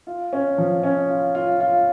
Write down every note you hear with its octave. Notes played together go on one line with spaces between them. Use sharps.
F4
C#4
F3
C#4
F4
F4
F4